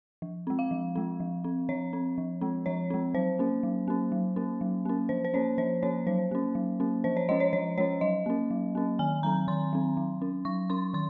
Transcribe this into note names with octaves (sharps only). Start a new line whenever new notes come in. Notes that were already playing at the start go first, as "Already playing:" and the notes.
F3
G#3 C4
F5
F3
G#3 C4
F3
C4
F3 C#5
C4
F3
G#3 C4
F3 C#5
G#3 C4
F#3 C5
A#3 C#4
F#3
A#3 C#4
F#3
A#3 C#4
F#3
A#3 C#4
F3 C5
C5
A#3 C#4 C#5
F3 C5
A#3 C#4 C#5
F#3 C5
A#3 C#4
F#3
A#3 C#4
F3 C5
C#5
G#3 C#4 D#5
C#5
F3 C#5
G#3 C#4 C#5
F#3 D#5
A#3 C#4
F#3
A#3 C#4
D#3 G#5
F#3 C4 A#5
D#3 C6
F#3 C4
F#3
C#4
F#3 C#6
C#4 C6
D#3 C6